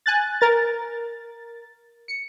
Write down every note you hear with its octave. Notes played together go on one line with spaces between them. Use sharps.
G#5 F#6 A6
A#4 A6
C#7